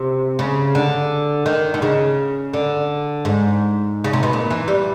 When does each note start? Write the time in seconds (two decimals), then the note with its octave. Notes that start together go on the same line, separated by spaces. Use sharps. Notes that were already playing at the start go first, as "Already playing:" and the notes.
Already playing: C3
0.39 C#3
0.75 D3
1.46 D#3
1.74 D3
1.82 C#3
2.53 D3
3.25 G#2
4.04 C#3
4.13 C3
4.23 B2
4.33 A#2
4.50 E3
4.68 G3